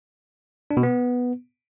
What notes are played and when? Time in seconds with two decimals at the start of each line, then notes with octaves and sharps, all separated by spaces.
0.71 D4
0.77 B2
0.83 B3